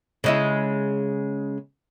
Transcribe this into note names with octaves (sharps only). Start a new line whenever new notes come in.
C#3 G#3 E4